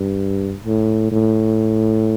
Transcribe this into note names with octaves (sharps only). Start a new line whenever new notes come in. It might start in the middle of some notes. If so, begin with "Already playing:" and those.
Already playing: G2
A2
A2